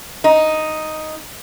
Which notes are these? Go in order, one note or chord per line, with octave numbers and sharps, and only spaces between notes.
D#4